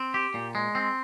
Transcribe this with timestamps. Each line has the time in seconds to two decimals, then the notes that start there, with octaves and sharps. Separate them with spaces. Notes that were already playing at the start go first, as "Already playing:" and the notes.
Already playing: C4
0.14 G4
0.34 A#2
0.55 G#3
0.75 C4